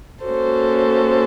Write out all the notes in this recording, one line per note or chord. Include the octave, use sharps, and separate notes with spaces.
A#3 C#4 F#4 A4 C5